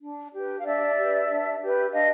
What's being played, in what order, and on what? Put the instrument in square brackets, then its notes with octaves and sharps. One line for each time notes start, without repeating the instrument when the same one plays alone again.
[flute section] D4
G4 B4
F5
D4 D5 E5
G4 B4
D4
G4 B4
D4 D#5 F5